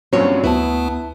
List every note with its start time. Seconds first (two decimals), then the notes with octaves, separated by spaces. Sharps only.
0.13 G2 A#2 F#3 C4 C#4 C#5
0.44 D2 B3 E4 B4 A5